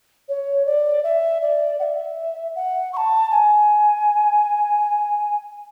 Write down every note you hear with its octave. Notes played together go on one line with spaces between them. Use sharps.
C#5
D5
E5
D5
F#5
E5
F#5
C#6
A5
G#5